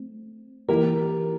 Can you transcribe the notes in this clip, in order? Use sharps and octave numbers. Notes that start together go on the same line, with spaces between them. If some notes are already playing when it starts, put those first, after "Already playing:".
Already playing: A3 C4
E3 A#3 E4 G4 A#4